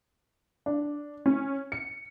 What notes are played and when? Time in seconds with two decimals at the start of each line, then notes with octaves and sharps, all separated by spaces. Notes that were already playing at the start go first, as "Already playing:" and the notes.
0.66 D4
1.26 C#4
1.72 C#7